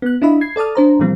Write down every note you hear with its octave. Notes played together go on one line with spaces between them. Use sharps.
B3 F#6
D4 E4 F4 D#5 E5 B5
G#6 C7
A4 D5 A5 D#6 F6
D4 C5 A#5
A#2 E3 F3 G3 A#3 C4